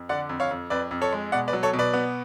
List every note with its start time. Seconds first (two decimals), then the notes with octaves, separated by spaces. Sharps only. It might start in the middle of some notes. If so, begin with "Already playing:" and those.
Already playing: F2
0.09 D3 D5 F#5
0.29 F2
0.40 C#5 F5
0.51 F2
0.70 F2 B4 D5
0.91 F2
1.02 A4 C#5
1.12 G#3
1.32 B2 D5 F#5
1.48 B4 D5
1.53 F#3
1.63 A4 C#5
1.73 B2
1.79 B4 D5
1.93 B3